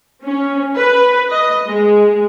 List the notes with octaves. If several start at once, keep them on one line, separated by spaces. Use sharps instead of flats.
C#4
B4
D#5
G#3